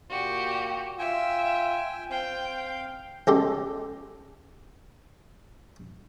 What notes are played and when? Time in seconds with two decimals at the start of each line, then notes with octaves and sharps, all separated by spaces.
0.10 A#2 F#4 G4
0.99 F4 E5 G5 G#5
2.11 C4 F5 G5
3.27 C#2 G4 A4 D#5 C6